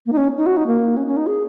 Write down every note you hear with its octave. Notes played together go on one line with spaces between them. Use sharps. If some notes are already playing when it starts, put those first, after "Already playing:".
A#3
D#4
C#4
D#4
F#4
D#4
A#3
C#4
C#4
D#4
G#4